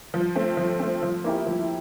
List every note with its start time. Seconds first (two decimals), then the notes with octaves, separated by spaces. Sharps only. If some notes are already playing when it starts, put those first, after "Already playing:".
0.14 F3
0.36 A3 C4
0.57 F3
0.80 A3 C4
1.03 F3
1.24 A#3 E4 G4
1.47 F3